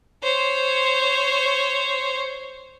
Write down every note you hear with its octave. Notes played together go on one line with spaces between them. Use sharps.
C5 C#5